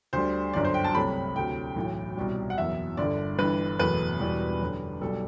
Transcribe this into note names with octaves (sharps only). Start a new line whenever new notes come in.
D2 D3 G3 C5
G1 F#2 D3 D5
C5
G5
A5
C2 C3 F#3 A3 B5
D2 C3 F#3 A3 G5
B1 A2 E3 A3
C2 B2 G3
F#5
F#1 E2 B2 E5
G1 G2 D3 D5
G1 G2 E3 B4
F#1 E2 B2 A3 B4
E1 E2 B2 G3
F#2 D3 G3
B1 B2 G3 A4